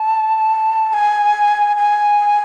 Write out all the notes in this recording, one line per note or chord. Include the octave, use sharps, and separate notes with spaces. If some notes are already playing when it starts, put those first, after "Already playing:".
Already playing: A5
A5
G#5
G#5